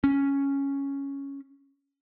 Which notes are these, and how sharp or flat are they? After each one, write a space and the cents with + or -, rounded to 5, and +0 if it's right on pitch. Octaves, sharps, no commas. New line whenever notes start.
C#4 +0